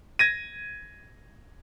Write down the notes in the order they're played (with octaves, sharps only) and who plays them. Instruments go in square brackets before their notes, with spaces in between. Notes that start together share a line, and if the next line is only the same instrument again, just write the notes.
[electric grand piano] G#6 A#6 D#7